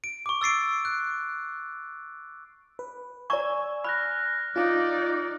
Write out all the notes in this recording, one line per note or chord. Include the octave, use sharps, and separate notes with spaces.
D7
C#6 D6
E6 A6 C7 D7
F#6
B4
D5 G#5 A#5 C#6 E6 G#6
B5 F6 F#6 A#6
D#4 F4 D5 F5